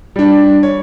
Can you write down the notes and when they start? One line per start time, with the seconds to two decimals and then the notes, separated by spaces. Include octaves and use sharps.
0.16 G3 D4
0.63 C#5